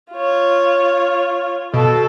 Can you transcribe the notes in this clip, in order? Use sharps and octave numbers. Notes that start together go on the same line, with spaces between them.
F4 C#5
B2 A4